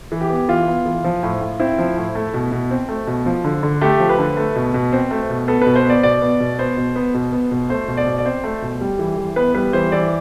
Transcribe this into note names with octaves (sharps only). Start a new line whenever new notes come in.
E3
G4
B3
E3 F4
B3
E3
F3
A2
A2
C4 E4
F3
A2
A3
B2
B2
C4
A3
B2
F3
D3
D3
A3 G4
F3
B4
D3
A3
B2
B2
C4
A3
B2
B3 A4
B2 B4
C5
B3 D5
B2 D5
B3
B2
B3 C5
B2
B3
B2
B3
B2
A3 C5
B2
D5
B2
D5
C4 C5
A3
B2
G3
E3
E3
B3 B4
G3 B4
E3 C5
E3 D5